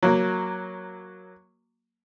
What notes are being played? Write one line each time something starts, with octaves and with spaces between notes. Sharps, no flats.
F#3 A#3